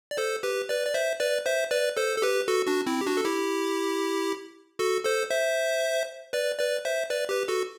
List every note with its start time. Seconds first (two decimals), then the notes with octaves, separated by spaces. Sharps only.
0.11 D5
0.17 A4 C5
0.43 G4 B4
0.69 B4 D5
0.86 D5
0.94 C5 E5
1.20 B4 D5
1.46 C5 E5
1.71 B4 D5
1.97 A4 C5
2.17 A4
2.22 G4 B4
2.48 F#4 A4
2.67 D4 F#4
2.86 C4 E4
3.01 G4
3.06 D4 F#4
3.17 A4
3.25 E4 G4
4.79 F#4 A4
5.05 A4 C5
5.31 C5 E5
6.33 B4 D5
6.59 B4 D5
6.85 C5 E5
7.10 B4 D5
7.29 G4 B4
7.48 F#4 A4